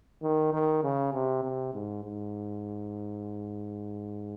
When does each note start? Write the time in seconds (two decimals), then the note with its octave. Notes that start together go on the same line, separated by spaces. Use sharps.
0.22 D#3
0.53 D#3
0.83 C#3
1.13 C3
1.43 C3
1.74 G#2
2.04 G#2